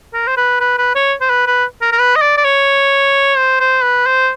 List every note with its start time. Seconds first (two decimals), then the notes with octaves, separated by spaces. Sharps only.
0.14 A#4
0.27 C5
0.37 B4
0.60 B4
0.78 B4
0.95 C#5
1.21 C5
1.30 B4
1.46 B4
1.82 A#4
1.92 A#4
1.99 B4
2.16 D#5
2.22 D5
2.38 D5
2.44 C#5
3.37 C5
3.60 C5
3.83 B4
4.06 C5